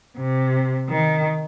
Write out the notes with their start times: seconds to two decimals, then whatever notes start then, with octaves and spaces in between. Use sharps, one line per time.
0.17 C3
0.89 D#3